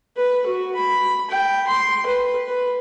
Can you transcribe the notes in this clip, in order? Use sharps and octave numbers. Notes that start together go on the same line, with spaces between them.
B4
F#4
B5
G5
C6
B4
B4